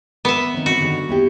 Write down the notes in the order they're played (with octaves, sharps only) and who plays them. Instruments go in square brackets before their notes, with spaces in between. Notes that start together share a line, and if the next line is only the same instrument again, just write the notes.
[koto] B3 E5
[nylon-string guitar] D#3 C4
[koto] F#4
[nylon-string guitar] D3 D#3 A4
B3 E4 G4